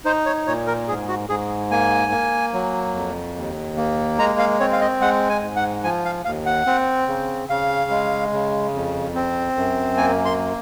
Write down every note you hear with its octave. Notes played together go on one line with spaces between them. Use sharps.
D#4 C5
C#5
A#2 C#5
A#4
G#2 G#4
F#4
G#2 G#4
A#3 G#5
A#3
F#3
F2
D#2
A#3
G#3 A#5
F5
C4 C#5
F5
D#5
G#3 F#5
G#5
G#2
F#5
F3 G#5
F5
D#2 F5
F#5
C4
C#3
C#3 F5
G#3
C#3
F2
C4
F#2
A#3 G#5
C6